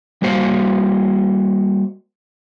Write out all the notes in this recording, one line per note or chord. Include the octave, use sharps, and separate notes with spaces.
G3 A#3 F#4 C5 F5